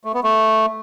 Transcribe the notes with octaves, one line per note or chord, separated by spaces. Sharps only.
A3
B3
A3